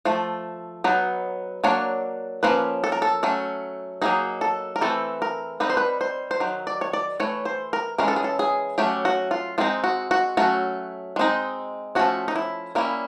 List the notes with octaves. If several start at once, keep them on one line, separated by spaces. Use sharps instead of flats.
F3 A3
F#3 B3 D#4
F#3 A#3 D4 C#5
F3 A#3 C#4 B4
A4
A#4
A4
F#3 A3 C#4
F#3 A#3 D#4 G#4
A4
A#4
E3 A3 C4 A4
A#4
G3 C4 D#4 B4
C5
B4
C5
C5
D#3 F#3
D5
C#5
D5
E3 A3 C#5
C5
A#4
E3 G#3 C#4 A#4
A4
G#4
A4
G#4
F#3 A3 C#4 G4
F#4
F4
G#3 C4 D#4 F4
F#4
F#4
F#3 A3 C#4 F#4
G#3 C4 D#4
F3 A3 C#4 F#4
D#4
E4
G3 A#3 C#4 E4